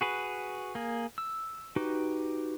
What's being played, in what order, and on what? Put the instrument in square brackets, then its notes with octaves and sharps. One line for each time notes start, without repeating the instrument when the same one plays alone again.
[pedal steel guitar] F#4 G#4 B4
A#3 G#4
E6
D#4 F#4 G4 B4